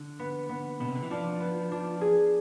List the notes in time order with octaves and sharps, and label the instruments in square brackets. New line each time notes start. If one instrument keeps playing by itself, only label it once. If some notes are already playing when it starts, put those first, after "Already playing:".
Already playing: [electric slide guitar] D3
[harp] B3
B3
[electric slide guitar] B2 [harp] B3
[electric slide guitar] C3
D3
E3
[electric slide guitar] F3 [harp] D4
[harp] B3
D4
G#4